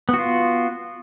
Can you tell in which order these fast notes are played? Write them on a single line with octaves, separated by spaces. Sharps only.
B3 F#4 F4